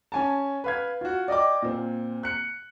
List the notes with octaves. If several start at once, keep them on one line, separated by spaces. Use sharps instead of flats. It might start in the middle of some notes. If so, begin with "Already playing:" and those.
C#4 G#5 A5
B4 F5 G#6
F4 F#4
D5 D#5 G5 D6
A#2 C4
F#6 C#7